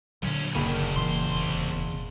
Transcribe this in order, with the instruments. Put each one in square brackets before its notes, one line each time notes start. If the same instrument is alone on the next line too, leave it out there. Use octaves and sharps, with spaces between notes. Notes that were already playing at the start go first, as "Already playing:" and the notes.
[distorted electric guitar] D2 C#4 [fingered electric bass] A#2 D3 F#3
[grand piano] F#1 A#3 B5 [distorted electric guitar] F#2 D#3
[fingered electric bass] E1 A#2 E3 [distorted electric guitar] C2 C6